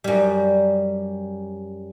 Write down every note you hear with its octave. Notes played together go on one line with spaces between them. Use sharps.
F#2 G3